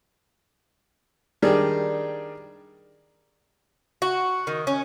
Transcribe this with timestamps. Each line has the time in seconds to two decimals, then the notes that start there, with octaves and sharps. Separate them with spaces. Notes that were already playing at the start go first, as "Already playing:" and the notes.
1.42 D#3 G3 D4 G#4
4.02 F#4
4.47 D#3
4.67 C#4